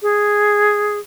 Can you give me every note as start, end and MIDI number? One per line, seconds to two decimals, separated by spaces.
0.02 0.99 68